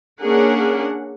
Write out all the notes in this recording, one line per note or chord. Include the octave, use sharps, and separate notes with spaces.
A#3 C#4 D4 G#4 A#4 F#5